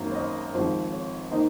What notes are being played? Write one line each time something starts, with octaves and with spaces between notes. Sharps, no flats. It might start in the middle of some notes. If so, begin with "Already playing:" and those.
Already playing: G#1 F#2 D#3 A#3
C#5
C5 D#5
G#1 G#2 F3 C4 C5
C#5
D#3 A#3 D#4 C5 D#5